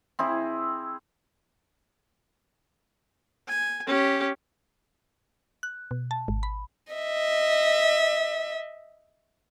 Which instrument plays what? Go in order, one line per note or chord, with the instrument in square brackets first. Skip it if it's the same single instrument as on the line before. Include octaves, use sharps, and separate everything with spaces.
[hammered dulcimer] C4 E4 G#4
[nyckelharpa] G#5
C#4 G4
[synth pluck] F#6
B2
A5
G#1
B5
[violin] D#5 E5